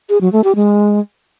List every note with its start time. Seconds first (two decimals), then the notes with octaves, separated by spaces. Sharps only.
0.09 G#4
0.21 F#3
0.32 A3
0.44 G4
0.56 G#3